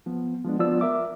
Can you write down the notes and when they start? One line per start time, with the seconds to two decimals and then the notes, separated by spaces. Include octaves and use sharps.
0.06 F3 B3
0.45 F3 G#3 B3 D4
0.59 F3 B3 F4 D5 E6
0.81 A#4 E5 D6